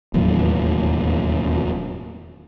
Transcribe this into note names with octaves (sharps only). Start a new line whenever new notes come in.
E1 D#2 A2 F#3